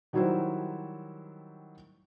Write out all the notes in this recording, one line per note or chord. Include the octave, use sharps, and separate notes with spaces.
D#3 F#3 G3 E4 F#4 C5